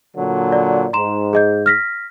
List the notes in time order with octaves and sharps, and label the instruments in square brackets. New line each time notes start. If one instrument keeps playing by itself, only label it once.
[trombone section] A#2 D3 F#3
[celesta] D5
[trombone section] G#2 [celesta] A#5 C6 E7
[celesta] G#4 D#5 G6
F6 A#6 B6